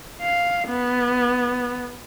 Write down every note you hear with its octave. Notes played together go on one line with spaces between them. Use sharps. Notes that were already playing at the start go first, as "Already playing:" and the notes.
F5
B3